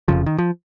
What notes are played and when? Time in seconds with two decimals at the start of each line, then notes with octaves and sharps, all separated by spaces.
0.08 F1 F2 C#3 F3
0.26 D#3
0.38 F3